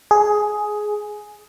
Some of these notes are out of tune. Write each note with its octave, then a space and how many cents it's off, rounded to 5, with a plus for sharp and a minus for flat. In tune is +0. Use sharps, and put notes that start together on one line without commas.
G#4 +10